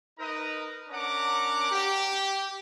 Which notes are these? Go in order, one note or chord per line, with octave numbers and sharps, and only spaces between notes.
D#4 A#4 B4 D#5 A#5 D#6
C#4 D4 A#4 F#5 A#5 D6
G4